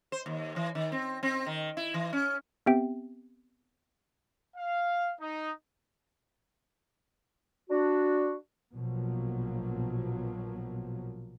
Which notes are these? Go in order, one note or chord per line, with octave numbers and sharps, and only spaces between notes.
C5
D#2
E3
D#3
C4
C4
D#3
E4
E3
C#4
B3 C4 G4 E5 G5
F5
D#4
D4 F#4
A#1 B2 F3 F#3 A#3